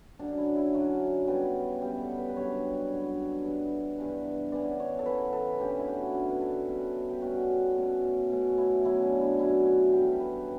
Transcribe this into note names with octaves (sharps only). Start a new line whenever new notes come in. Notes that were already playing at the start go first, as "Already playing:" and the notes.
D3 F#3 C#4 D4
E4
E4
D3 F#3 C#4 F#4
C#3 G3 B3
C#3 G3 B3 G4
A4
B4
B4
F#2 D3 G3 C#5
F#2 D3 G3
G2 E3 B3 D4
G2 E3 B3 D4
C#3 E3 B3 D5
C#5
A4
C#3 E3 B3 B4
A4
D3 A3 C#4 G4
E4
F#4
D3 A3 C#4 F#4
B4
A4
B2 G3 C#4
G4
B2 G3 C#4 F#4
B2 A3 C#4
B2 A3 C#4
E4
B2 F#3 C#4 E4
D4
E4
B2 F#3 C#4 E4
F#4
G2 E3 A3 G4
A4
G4
B4